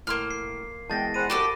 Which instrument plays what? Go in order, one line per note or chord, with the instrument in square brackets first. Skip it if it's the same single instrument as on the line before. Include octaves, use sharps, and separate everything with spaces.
[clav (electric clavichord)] A2 [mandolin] A#3 C6 F6
[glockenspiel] C7
[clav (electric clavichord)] E2 G#3 [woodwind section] G5 [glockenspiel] A5 A6 A#6
[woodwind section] G#4 C5 F#5 [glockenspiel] B5 D#7
[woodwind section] C2 D6 [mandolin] F#4 G4 A4